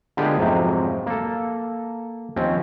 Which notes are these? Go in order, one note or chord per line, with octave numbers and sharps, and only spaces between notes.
D3 G#3 B3 F4 G4 G#4
F2 G#2 C3 F3 F#3
A#3 A4
D#2 F3 C4 C#4